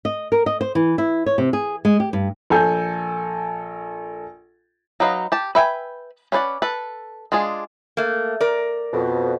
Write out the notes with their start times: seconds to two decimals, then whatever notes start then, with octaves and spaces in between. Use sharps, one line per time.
0.05 D#5
0.32 A#4
0.46 D#5
0.61 C5
0.75 E3
0.98 E4
1.26 C#5
1.38 C3
1.53 G#4
1.85 G#3
2.00 G4
2.13 G2
2.50 A#1 A4 G#5 G6
5.00 F#3 D#4 B4 D#5 F5
5.32 G4 A5
5.55 B4 E5 G5 G#5
6.32 C#4 B4 C5 D5 F#5
6.62 A4 B4
7.32 G#3 D4 F4 G#4
7.97 A3 A#3
8.41 A#4 D5
8.93 F2 B2